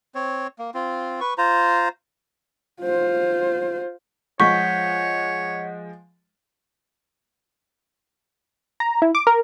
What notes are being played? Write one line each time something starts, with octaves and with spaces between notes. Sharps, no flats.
C4 C#5
A#3
C4 F4
B4 C#6
F4 C5 A#5
F4 C5
F3 G#3 C#5 F#5 C#6 G6 B6
A#5
E4
D6
A#4